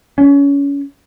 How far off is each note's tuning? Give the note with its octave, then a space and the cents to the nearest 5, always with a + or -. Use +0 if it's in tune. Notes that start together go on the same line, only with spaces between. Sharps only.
C#4 +25